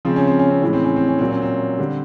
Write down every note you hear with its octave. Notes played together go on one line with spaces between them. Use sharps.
C#3 F3 G#3 C4
C#4
C4
C#4
C4
A2 E3 G#3 C#4
C4
C#4
C4
C#4
A#2 F#3 C4
C#4
C4
D3 G3